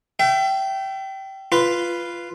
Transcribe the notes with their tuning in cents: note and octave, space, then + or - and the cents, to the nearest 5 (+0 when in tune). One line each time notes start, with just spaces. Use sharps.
E5 +35 G5 -20
F4 -10 B4 +0